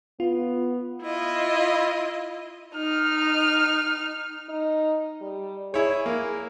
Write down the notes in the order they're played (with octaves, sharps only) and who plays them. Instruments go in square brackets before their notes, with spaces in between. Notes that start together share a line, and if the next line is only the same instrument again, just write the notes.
[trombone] B3 [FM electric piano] F4
[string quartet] E4 F4 D#5
[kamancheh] D#4 F6
[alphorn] D#4
G3
[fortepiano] E4 C#5 [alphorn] G#4
[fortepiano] A#3